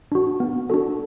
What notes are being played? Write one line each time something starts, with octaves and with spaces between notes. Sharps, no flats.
D4 F#4
B3
D4 F#4 A4